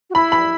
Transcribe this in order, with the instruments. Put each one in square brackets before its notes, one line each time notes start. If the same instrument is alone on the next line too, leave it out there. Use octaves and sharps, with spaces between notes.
[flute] F#4
[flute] E4 [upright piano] B5
[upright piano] B5